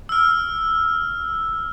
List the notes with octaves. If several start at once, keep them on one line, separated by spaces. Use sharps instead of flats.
E6 F6